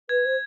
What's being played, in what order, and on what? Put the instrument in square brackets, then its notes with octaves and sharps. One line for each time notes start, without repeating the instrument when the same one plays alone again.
[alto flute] B4 [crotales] G#6
[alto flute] C5